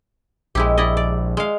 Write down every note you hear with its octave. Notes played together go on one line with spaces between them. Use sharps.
A#1 G#3 E4 G4
E4 D5 D#5
D5
G#3 F5